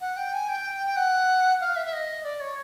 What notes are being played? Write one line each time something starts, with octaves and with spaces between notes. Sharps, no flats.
F#5
G5
G#5
G5
G5
F#5
F5
E5
E5
D#5
D5
C#5